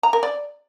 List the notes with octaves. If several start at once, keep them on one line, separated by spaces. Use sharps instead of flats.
A#5
A#4
D5